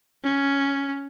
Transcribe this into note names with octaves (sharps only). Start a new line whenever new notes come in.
C#4